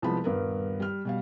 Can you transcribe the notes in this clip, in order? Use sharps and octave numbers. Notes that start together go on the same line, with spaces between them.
C2 F3 G#3 B3 A5 B5
D#1 G2 B3 A#4 B4
G3 F6
B2 G3 F5